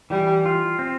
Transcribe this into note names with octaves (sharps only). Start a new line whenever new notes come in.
E3 G3
F4
C4